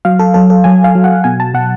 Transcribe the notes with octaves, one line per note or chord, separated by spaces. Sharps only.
F#3 F5
A4
F#3 A4
A4
F#3 G#5
F5
F#3
F#5
B2 G#5
A5
B2 F#5